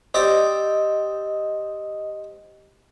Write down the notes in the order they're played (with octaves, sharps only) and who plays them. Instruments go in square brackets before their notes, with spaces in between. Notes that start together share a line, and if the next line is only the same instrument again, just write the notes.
[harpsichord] C4 G4 D5 [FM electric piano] D#5